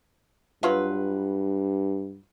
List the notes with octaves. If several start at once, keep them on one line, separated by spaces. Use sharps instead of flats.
G2 F#3 F4 B4